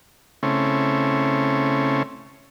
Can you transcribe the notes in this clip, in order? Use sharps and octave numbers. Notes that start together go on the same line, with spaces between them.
C#3 A3 C4 C#4 E4